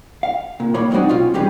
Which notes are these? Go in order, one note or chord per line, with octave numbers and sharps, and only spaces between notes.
F5
A#2
D#3 A#3 E4 C#5 B5
F#3 G#3 C4 D4 D#4 F#4
B2 C#4 F4 F5
E3 G3 C#4 G4 G#4 B4